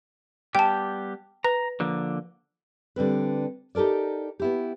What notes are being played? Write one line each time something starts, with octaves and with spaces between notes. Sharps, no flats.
G3 B3 G4 G5 A5
B4 A#5
D3 F3 A#3
D3 G3 C4 B4
D#4 G4 A4 A#4 D5
B3 E4 G4